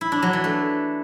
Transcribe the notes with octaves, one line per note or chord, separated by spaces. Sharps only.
E4
D4
F#3
E3
A3